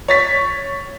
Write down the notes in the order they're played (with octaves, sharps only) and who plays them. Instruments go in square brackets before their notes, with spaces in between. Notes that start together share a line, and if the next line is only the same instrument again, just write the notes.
[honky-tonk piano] C#5 A6 B6